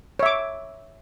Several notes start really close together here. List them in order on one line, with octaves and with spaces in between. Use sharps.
C#5 E5 D6